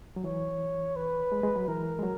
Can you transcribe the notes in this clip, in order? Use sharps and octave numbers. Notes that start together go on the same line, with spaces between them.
F#3
E3 C#5
B4
G#3
G#3
F#3
E3 A#4
G#3
F#3